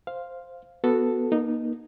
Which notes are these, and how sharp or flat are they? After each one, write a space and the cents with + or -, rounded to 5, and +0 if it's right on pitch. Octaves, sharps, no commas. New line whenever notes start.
C5 +0 F5 +0
B3 +0 F#4 -10 A4 +0
A#3 +35 D#4 -10